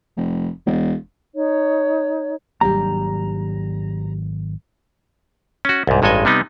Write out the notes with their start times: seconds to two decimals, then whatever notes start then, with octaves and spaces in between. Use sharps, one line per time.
0.17 F1
0.67 E1
1.34 D#4 C#5
2.61 G#1 F#3 G3 A#3 D4 G4 A#5
5.65 C#4 F#4
5.87 C2 G#2
6.02 A1 G2 G#3 A4 D#5 G#5
6.25 C3 G3 B3 D#4